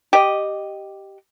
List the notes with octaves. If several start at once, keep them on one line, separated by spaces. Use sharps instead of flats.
G4 D#5